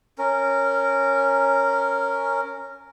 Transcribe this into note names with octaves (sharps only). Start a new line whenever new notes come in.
C#4 A#4